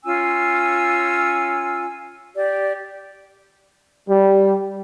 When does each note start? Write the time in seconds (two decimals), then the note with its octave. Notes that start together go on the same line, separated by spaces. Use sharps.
0.04 C#4 F4 G#5 E6
2.36 G4 D5
4.08 G3